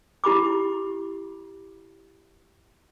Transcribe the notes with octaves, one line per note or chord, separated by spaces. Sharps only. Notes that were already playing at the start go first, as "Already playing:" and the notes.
E4 G4 B5 D6